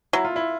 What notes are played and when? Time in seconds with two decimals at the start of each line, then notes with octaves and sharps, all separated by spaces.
0.13 F#3 E4
0.25 F4
0.36 E4